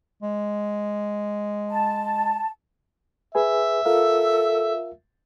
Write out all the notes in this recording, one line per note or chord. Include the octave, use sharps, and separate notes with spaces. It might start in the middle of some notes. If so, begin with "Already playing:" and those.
G#3
A5
G#4 B4 E5 G#5
F4 A4 A#4 F5